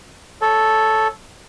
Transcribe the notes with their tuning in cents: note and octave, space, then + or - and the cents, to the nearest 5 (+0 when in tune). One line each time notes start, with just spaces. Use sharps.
A4 -5 C#5 +0